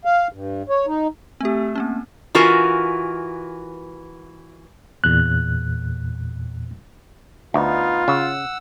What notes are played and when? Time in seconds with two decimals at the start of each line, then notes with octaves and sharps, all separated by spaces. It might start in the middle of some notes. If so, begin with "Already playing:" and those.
0.05 F5
0.32 G2
0.69 C#5
0.87 D#4
1.41 A3 C4 G4
1.75 A#3 C4 C#4
2.35 E3 F4 F#4 A#4 G#5
5.04 E2 A#2 F#6
7.54 D2 B3 D#4 F4
8.08 C#3 F#5 E6